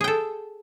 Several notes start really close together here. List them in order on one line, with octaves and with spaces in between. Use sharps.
G#4 G5 A4